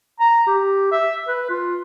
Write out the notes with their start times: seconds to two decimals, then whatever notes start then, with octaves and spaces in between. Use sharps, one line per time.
0.20 A#5
0.47 G4
0.91 E5
1.28 B4
1.50 F4